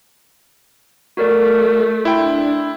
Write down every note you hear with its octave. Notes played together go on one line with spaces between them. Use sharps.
A3 F#4 A#4 D5
D4 E4 G5 C6